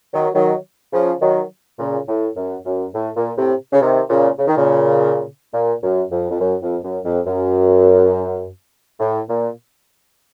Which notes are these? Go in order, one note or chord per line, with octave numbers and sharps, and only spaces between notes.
D#3 F#3
D#3 F#3
C#3 F3
D#3 F#3
A#2 C#3
A2
F#2
F#2
A2
A#2
A2 C3
C#3
C3 D#3
A#2 C#3
C#3
D#3
A#2 C#3
A#2
F#2
F2
F2
F#2
F2
F#2
F2
F#2
A2
A#2